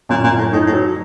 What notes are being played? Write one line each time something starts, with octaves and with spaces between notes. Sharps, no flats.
F#2 A#2
A#2
F#2
A2
A2 D#4
A2
F#3